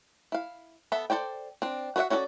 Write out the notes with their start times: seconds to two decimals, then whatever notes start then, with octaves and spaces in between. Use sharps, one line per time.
0.32 E4 F5
0.92 B3 A4 E5
1.10 A4 C5 D5 G5
1.62 C4 D4
1.96 F#4 B4 C#5 E5 F#5
2.10 C#4 F#4 A4 A#4 D5